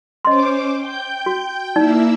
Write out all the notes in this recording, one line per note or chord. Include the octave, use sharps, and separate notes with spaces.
C#4 C5 D#5 C6 D6
G5 G6
F#4
A#3 D#4 E4 D5 E5